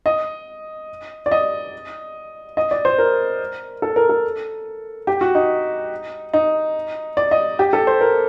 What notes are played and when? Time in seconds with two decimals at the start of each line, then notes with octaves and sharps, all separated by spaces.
0.06 D#5
1.26 D5
1.31 D#5
2.57 D#5
2.71 D5
2.85 C5
2.98 A#4
3.82 A4
3.96 A#4
4.09 A4
5.07 G4
5.21 F#4
5.35 D#4
6.33 D#4
7.17 D5
7.31 D#5
7.59 G4
7.73 A4
7.87 C5
8.01 A#4